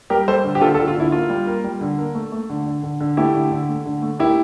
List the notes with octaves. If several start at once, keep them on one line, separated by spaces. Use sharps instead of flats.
G3 G4 A#4
G3 A4 C5
D3
G4
D3 F4 A4
F4 A4
D3
F4
D3 E4
A#3 F4
G3
A#3
G3
D3
A#3
A3
A3
D3
D3
D3
D3
A3 E4 G4
D3
D3
A3
D3
A3
A#3 E4 G4